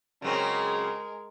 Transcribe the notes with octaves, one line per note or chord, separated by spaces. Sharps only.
C#3 F#3 G#3 C4 A#4